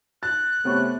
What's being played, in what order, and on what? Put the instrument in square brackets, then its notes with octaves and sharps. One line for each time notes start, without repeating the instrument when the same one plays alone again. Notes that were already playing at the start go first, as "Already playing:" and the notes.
[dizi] F#6 [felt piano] A6
[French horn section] C3 A3 [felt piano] B3 C#5 C#6